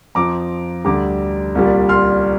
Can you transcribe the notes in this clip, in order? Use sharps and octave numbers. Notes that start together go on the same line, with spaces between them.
F2 F3 A#5 D6
D2 D3 G3 A#5 D6
C2 A#2 G3
C6 F6